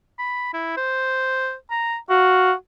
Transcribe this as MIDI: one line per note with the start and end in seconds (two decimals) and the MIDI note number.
0.19 0.50 83
0.54 0.74 64
0.77 1.54 72
1.71 1.97 82
2.10 2.53 66
2.10 2.52 77